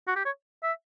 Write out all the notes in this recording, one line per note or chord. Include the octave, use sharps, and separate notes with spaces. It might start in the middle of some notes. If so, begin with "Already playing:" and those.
F#4
G4
C#5
E5